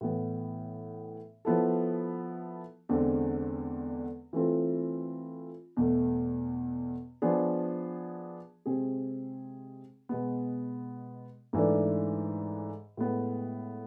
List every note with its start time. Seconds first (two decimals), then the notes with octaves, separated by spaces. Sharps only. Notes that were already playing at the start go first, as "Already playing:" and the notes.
0.01 A2 E3 B3
1.45 F3 B3 E4 A4
2.89 E2 D3 G#3 C4
4.33 E3 A3 C4 F4
5.77 E2 B2 A3
7.22 F3 B3 D4 G#4
8.66 C3 G#3 C4 G#4
10.09 B2 G#3 B3
11.53 G#2 E3 A3 D4
12.97 A2 G#3 B3